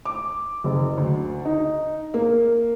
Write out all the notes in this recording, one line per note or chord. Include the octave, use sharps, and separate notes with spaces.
D6
F#1
D2
D#4
A#3